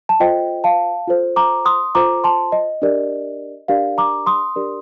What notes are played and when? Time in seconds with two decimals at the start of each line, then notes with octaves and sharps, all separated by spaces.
0.09 A5
0.20 F4 A4 C5 D#5 G5
0.64 F5 A5
1.07 F4 A4 C5
1.36 A#5 D6
1.65 C6 D#6
1.95 F4 A4 C5 A#5 D6
2.24 A5 C6
2.52 D#5
2.82 D4 G4 A#4 D5
3.68 D4 G4 A#4 D5 F5
3.98 A#5 D6
4.26 C6 D#6
4.56 D4 G4 A#4 D5